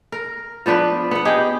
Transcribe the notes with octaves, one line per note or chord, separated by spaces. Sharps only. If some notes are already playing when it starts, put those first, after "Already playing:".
A#4
F3 B3 D4 B4
B3 F#5
D#4 G4 G#4